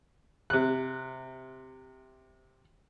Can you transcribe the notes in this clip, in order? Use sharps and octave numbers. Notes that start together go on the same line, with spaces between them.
C3 F#6